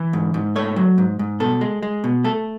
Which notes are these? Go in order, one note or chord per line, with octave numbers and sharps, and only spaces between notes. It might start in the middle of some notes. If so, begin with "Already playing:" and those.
Already playing: E3
G#2
G#2
A3 C#5
F#3
G#2
G#2
B2 A4
G#3
G#3
B2
A3 A4